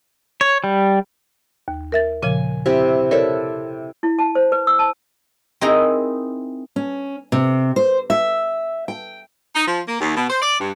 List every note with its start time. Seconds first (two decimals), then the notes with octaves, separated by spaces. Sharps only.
0.41 C#5
0.64 G3
1.68 D#2
1.92 A#4 E5 A6
2.22 A#2 C#3 F3 G#5
2.66 C3 E4 G4
3.11 E4 A4 A#4 C#5 D5
4.03 E4
4.19 A5
4.35 C5
4.52 B4
4.67 E6
4.79 A5
5.61 C4 D#4 E4 G#4 A#4 A#5
6.76 C#4
7.32 C3
7.76 C5
8.10 E5
8.88 G5
9.55 D#4
9.68 F3
9.88 A#3
10.00 D#2
10.16 B2
10.29 C5
10.42 D5
10.60 G2